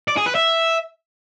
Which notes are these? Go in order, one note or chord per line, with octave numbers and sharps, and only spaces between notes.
D5
G#4
B4
E5